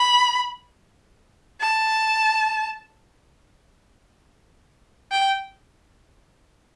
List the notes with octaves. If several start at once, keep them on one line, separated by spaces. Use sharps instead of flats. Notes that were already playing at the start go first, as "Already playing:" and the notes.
Already playing: B5
A5
G5